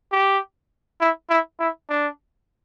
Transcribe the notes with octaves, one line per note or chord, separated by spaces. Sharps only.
G4
E4
E4
E4
D4